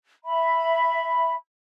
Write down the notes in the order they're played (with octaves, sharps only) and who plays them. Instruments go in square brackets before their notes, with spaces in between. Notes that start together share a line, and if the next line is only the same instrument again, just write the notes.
[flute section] E5 B5